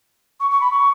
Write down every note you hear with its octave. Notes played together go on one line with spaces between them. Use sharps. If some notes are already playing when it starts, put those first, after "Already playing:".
C#6
C#6
B5
C#6